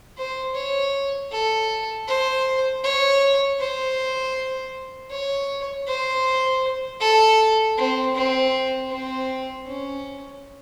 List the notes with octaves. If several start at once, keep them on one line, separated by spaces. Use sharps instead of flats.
C5
C#5
A4
C5
C#5
C5
C#5
C5
A4
C4
C4
C4
C#4